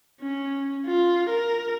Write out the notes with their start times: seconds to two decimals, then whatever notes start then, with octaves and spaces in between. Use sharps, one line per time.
0.21 C#4
0.87 F4
1.30 A#4